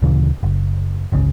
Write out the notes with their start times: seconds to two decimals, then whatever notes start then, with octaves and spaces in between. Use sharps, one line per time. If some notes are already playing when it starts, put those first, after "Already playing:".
0.02 D2 A#2 C#3 E3
0.43 F#1
1.12 G1 C#2 C#3